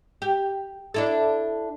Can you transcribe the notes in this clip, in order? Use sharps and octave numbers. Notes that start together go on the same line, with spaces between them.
G4
D4 E4 A4